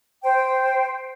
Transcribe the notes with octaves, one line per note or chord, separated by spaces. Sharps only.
C5 G5